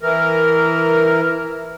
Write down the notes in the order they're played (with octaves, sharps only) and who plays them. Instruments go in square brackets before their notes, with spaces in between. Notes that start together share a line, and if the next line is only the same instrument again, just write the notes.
[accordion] E3 A#4